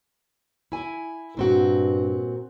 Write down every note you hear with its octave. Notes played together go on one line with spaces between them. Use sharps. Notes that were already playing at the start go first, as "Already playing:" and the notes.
E4 G#5
G2 A#2 C4 F#4